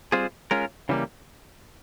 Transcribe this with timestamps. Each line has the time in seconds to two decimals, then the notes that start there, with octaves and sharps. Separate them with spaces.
0.12 G3 C4 F4 G#4 C5
0.51 G#3 C#4 F4 A#4
0.89 C#3 E3 G3 A#3